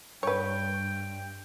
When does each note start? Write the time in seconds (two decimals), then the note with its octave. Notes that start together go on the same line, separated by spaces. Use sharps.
0.23 G2 B4 C#5 G5